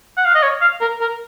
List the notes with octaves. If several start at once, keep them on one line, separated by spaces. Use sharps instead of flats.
F#5
F5
D#5
C#5
F5
A#4
A#4